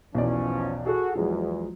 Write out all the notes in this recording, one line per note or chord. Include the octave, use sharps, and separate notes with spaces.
B1 E2 B2 F3 C#4 D5
F#4 G#4 A4
E2 F3 F#3 G#3